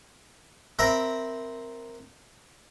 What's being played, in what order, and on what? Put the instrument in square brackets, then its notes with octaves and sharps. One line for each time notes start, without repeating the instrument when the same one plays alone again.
[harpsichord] C4 A#4 E5 A#5 B5